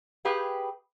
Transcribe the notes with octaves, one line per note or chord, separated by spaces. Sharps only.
G4 G#4 B4 F5 G5